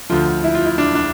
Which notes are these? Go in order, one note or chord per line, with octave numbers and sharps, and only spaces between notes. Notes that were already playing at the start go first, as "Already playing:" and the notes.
D2 D3 F3 F4
E4
F4
E4
D4
D4